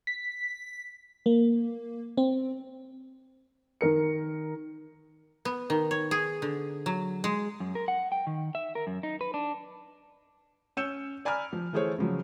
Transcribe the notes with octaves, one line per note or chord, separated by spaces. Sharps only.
B6
A#3
C4
D#3 A#4 C#7
B3
D#3
C#5
G#4
D3
F#3
G#3
F#2
A#4
F#5
G5
D#3
E5
A#4
F#2
D#4
B4
D4
C#4 C#5 E6 G6 C#7 E7
D5 G#5 A#5 B5 F6
F3
E3 A3 E4 G#4 C5 C#5
C#3 F3 F#3